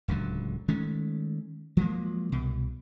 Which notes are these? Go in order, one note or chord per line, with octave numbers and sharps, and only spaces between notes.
D1 C#2 D3 F#3
D#3 G#3 A3 C#4
F3 F#3 G#3 A#3
C2 B2